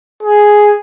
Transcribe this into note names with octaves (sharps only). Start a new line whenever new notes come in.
G#4